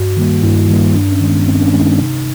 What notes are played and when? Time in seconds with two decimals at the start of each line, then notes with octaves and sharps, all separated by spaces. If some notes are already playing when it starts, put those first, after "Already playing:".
Already playing: G2 F#4
0.17 D#3 G3 A#3
0.43 G2 E4
0.69 D#3 G3 A#3
0.94 G2 D4
1.12 C#4
1.21 D#3 G#3
1.29 B3
1.46 G2 C4
1.60 D4
1.64 C#4
1.73 D#3 G#3
1.81 D#4
1.99 C3